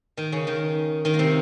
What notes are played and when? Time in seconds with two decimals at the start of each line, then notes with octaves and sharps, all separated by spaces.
0.17 D#3 D#4
0.32 C#3 C#4
0.47 D#3 D#4
1.05 D#3 D#4
1.14 A#3
1.19 C3 C4